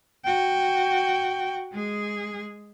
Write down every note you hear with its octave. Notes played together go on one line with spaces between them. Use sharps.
F#4 G5
G#3 G#4